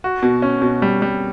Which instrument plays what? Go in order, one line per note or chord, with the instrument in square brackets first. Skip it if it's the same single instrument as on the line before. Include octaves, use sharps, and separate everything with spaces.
[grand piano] F#4
B2
C#4
B2
G3
G3